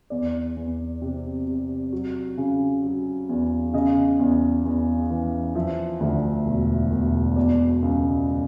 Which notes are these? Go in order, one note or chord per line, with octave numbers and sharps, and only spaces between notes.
E2 D5
E2
C3
C3
F#3
C#3
F#3
E2
C#3 D#5
E2
E2
E3
F3 E5
D2
E1
E1
B2 D5
C#2